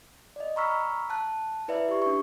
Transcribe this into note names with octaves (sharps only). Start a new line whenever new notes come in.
D5 D#5
A#5 B5 C#6 E6 F6 B6
A5 F#6
E4 B4 D5 E5
G4 C#6
D4 C#6